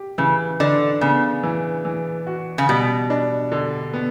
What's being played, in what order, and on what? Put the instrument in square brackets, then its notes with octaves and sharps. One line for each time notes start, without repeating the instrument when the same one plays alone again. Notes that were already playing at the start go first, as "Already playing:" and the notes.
Already playing: [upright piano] G4
[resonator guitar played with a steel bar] C#3 [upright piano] E3
[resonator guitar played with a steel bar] D3 [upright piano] D4
[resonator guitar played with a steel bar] C#3 [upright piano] B3
[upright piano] E3
E3
F#4
[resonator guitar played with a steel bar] C#3
[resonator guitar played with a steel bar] B2 [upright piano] G3
[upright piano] D4
D3
B3